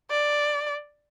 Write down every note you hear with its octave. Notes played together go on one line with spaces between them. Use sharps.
D5